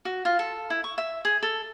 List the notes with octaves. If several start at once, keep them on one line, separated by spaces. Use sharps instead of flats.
F#4
F4
A4
E4
C#6
E5
G#4
A4